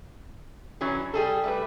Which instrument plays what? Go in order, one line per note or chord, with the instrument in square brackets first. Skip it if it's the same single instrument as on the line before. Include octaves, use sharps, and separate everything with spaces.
[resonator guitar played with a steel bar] E3 F#3 C#4 D4
G3 G#4 A4
G3 A3 B4